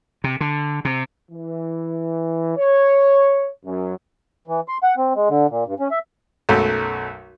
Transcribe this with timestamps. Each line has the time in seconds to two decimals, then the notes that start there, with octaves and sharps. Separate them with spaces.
0.24 C3
0.41 D3
0.85 C3
1.31 E3
2.57 C#5
3.65 F#2
4.48 E3
4.68 C6
4.83 F#5
4.97 C4
5.16 G#3
5.29 D3
5.50 A#2
5.66 G2
5.80 C#4
5.91 E5
6.49 B1 F#2 A3